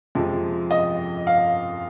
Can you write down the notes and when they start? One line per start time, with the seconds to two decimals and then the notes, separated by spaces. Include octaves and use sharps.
0.15 F2 C3 F3 G#3
0.71 D#5
1.27 F5